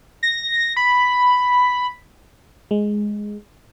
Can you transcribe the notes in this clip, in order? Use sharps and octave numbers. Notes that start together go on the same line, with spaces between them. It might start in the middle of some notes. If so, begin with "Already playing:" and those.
A#6
B5
G#3